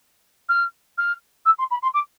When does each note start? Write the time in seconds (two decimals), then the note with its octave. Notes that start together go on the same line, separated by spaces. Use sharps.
0.49 F6
0.98 F6
1.45 E6
1.58 C6
1.71 B5
1.82 C6
1.94 D6